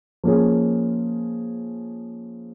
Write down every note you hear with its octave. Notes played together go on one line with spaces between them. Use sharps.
F3 A#3 C#4 G#4